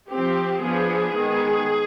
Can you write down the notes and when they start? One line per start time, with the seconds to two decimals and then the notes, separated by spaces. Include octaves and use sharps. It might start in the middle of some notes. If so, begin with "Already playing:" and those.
0.10 F3 C4 G4
0.61 F3 B3 D4 G#4
1.13 D#3 G#3 B3